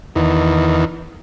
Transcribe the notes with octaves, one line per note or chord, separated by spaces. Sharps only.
E2 D#3